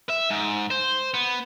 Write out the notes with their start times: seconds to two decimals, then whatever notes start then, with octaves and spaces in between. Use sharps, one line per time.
0.09 E5
0.30 G#2
0.71 C5
1.14 B3